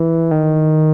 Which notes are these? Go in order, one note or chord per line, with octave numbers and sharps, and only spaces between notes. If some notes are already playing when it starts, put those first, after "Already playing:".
Already playing: E3
D#3